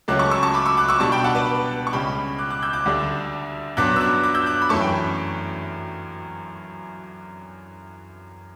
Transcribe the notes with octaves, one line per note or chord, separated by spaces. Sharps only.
C#2 C#3 F#3 A3 C#4 D6 F#6
A5 C#6
C#6 E6
A5 C#6
B5 D6
C#6 E6
D6 F#6
C#6 E6
B2 G3 D4 A5 C#6
G5 B5
F#5 A5
B4 D5
C#6
C#2 C#3 G3 G5 B5
D6 F#6
D6 F#6
E6 G6
D6 F#6
D2 D3 G3 D4
G2 F#3 B3 D4 D6 F#6
E6
D6 F#6
D6 F#6
E6 G6
D6 F#6
B5
F#2 E3 A3 C#4 A5 C#6
G5 B5